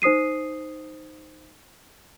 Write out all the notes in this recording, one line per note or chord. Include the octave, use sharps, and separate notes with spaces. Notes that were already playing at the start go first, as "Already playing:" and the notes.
D#4 C5 D#6 C7 D#7